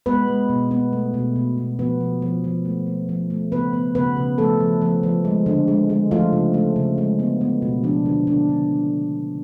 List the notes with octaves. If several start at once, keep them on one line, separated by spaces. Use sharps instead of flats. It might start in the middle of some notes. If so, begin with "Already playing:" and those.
G#3 B3 B4
G#3
B2
B3
A3
B2
B2
B2
F3 B3 B4
F3
F3
F3
A3
A3
F3
A3
C#3 B3 B4
B3
C#3 B3 B4
C#3
F3 A3 A4
F3
F3
F3
G#3
D3
G#3
G#3
F3 A3 F4
C#3
A3
C#3
G#3
B3
B3
B2
F3 D4
D3
D3 D4
D3